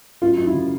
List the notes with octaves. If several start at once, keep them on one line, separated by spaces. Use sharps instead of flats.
F#2 F4
F#2
E4
C#3